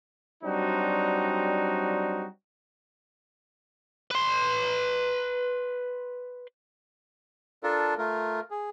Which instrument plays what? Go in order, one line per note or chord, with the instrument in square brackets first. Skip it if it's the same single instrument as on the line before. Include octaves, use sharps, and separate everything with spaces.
[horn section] F#3 G3 C4 D4 D#4 F#4
[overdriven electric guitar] B4 C6
[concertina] D4 F4 A4 A#4
A3 F4 A#4
G#4